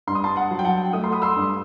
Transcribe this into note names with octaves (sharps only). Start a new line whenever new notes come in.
G2 C6
D#6
A5 C6
F#5 A5
F#3
G5
F#5 A5
A3 D#6
C6
B5 D#6
C6 E6
G2